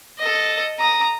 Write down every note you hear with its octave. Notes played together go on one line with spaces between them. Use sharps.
A4 D#5
A#5 D#6